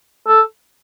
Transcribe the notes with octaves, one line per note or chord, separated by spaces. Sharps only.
A4